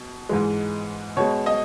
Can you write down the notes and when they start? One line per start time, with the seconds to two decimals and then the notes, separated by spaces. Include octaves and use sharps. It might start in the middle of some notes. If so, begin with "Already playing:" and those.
Already playing: B2
0.29 G#2 E3 G#3
1.17 B2 G#3 C#5
1.46 D#5